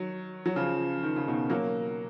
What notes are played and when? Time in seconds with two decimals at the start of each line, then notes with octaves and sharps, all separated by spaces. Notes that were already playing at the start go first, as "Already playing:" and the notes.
Already playing: D#3 F#3
0.46 F#3
0.56 C#3 F3
1.03 D#3
1.16 C#3
1.28 B2 D#3
1.50 F#3 A#3